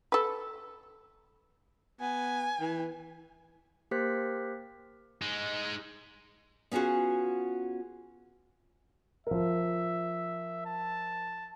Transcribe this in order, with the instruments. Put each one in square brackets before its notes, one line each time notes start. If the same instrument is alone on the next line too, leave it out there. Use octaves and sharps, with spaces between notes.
[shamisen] A4 B4
[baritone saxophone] B3 [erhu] G#5
[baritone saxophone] E3
[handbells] A#3 G4 A#4 C5 F#6 B6
[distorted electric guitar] G#3 D#4
[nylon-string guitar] B3 C#4 F4 F#4 G#4
[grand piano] F3 A#4 [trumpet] E5
[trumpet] A5